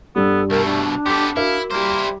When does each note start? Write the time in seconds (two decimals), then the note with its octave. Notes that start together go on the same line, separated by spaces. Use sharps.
0.16 G2 G3 B3 A4
0.50 C2 B2 A3 A#4
0.65 D4
1.06 B3 G4 A4 C6 D6 B6
1.36 E4 F#4 A#4 E5 F5
1.71 G3 A#3 E4 C5